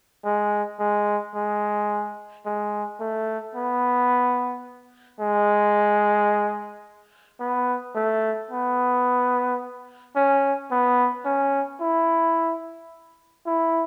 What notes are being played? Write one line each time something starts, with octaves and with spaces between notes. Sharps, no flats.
G#3
G#3
G#3
G#3
A3
B3
G#3
B3
A3
B3
C#4
B3
C#4
E4
E4